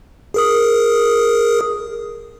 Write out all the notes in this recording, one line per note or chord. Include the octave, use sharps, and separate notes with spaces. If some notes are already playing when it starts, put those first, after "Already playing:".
G#4 A#4 D#6